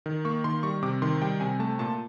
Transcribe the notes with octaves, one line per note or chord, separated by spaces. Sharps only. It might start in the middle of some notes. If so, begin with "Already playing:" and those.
D#3
A#3 C#6
D#3 C6
G3 C#6
C3 D6
D#3 C6
G3 G5
C3 G#5
A3 A5
A#2 A5